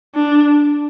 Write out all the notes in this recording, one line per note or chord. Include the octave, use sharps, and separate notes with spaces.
D4